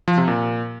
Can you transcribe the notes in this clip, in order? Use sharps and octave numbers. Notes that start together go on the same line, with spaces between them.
F3
C3
A#2